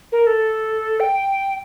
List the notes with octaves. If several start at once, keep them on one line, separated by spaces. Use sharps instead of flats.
A#4
A4
G5